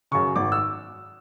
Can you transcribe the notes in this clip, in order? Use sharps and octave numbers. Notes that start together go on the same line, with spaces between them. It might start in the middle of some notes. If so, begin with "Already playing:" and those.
F#2 C#3 C#6
G#1 D6
E6